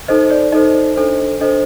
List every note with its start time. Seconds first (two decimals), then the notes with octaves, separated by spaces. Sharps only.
0.08 D#4 A4 C5 D#5
0.30 D5
0.52 D#4 A4 C5 D#5
0.96 D4 A4 C5
1.41 D4 A4 C5 D#5